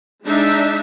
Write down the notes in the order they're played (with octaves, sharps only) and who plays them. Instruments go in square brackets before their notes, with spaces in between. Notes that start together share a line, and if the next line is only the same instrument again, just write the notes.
[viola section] G#3 D4 D#4 E5